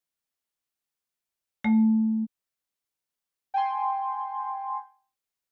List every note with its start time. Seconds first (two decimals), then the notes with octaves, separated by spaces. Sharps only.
1.64 A3
3.54 G5 G#5 C6